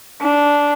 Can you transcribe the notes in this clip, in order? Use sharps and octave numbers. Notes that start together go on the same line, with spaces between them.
D4